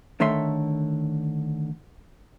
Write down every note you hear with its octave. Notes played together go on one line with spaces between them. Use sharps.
D3 D#3 A3 C#5 E5 C6